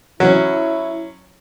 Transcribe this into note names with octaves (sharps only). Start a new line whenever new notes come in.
F#3 C#4 E4